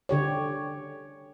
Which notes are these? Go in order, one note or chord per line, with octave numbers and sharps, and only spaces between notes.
D3 G4 C#5